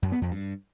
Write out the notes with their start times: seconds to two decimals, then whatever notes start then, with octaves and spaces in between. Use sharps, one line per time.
0.02 F#2
0.12 B3
0.22 F2
0.31 G2